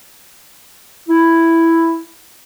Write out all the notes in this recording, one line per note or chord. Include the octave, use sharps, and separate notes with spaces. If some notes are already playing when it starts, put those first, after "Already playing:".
E4